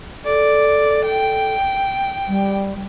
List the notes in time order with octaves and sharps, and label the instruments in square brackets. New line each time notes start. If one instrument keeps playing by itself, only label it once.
[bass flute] A4 [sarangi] D5
[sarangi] G5
[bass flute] G3